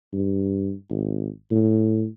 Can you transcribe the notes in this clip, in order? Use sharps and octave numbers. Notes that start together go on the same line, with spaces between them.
G2
G#1
A2